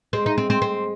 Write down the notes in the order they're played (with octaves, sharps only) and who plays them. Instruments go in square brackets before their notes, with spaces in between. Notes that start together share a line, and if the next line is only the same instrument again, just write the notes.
[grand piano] G#3 [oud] C4
[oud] D#4
C4
C4
C4